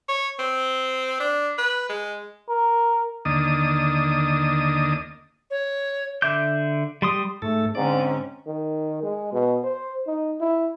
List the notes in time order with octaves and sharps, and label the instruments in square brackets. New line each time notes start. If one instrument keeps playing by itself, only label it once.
[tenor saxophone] C#5
C4
D4
B4
G#3
[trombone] A#4
[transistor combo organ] D#2 D3 A#3 D4 D#5 D#6
[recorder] C#5
[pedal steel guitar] D3 E5 D6 G6
G3 C6 D#6
[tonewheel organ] G#2 A4 [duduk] A3
[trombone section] G#2 [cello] D3 C#4 [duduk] C4 [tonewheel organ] D5
[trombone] D#3
G#3
B2
C5
D#4
E4